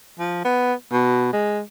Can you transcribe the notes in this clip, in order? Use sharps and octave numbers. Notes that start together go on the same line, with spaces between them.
F3
B3
B2
G#3